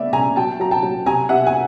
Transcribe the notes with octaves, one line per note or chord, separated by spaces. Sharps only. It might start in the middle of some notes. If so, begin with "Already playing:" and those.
Already playing: C#3 A3 B3 D5 E5
C#3 G#5 A#5
F#3 G5 A5
F#3 A#5
G5 A5
F#3
C3 G#5 A#5
C3 E5 F#5
G#5